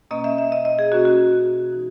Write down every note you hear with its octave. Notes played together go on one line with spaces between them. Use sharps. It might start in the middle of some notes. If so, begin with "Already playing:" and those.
B2 A#3 C#4 D#5
E5
E5
D#5
D#5
G#4
B2 A#3 C#4 F#4
F#4
E3 G#3 D#4